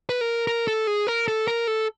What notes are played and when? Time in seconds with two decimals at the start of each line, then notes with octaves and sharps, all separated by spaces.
0.09 B4
0.21 A#4
0.47 A#4
0.68 A4
0.87 G#4
1.07 A#4
1.28 A4
1.48 A#4
1.67 A4